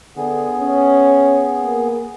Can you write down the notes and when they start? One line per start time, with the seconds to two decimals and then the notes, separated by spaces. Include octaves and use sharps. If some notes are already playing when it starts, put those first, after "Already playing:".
0.17 D3 B3 G#4
0.60 C#4
1.63 A#3